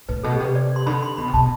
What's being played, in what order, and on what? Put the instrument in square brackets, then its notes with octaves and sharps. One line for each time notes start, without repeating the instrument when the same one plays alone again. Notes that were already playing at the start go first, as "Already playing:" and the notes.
[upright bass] A2 [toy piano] B4
[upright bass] B2 [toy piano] A4
[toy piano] G4
[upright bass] C3
[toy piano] B4
D5
C6
[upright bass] D3 [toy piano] B5
[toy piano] C6
[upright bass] B2 [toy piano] B5
[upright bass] C3
[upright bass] B2 [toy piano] A5